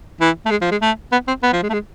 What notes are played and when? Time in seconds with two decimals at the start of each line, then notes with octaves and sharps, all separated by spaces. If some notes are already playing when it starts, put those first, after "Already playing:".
0.21 E3
0.46 A3
0.51 G#3
0.62 F3
0.71 G#3
0.81 A3
1.12 B3
1.28 C4
1.43 B3
1.53 F3
1.63 G#3
1.69 A3
1.73 G#3